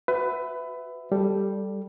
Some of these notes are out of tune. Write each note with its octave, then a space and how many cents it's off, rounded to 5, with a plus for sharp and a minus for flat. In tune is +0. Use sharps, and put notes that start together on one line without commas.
F#4 +0 B4 +20 E5 +0
G3 +0 A4 +0